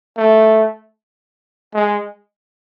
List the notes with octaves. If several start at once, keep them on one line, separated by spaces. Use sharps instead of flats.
A3
G#3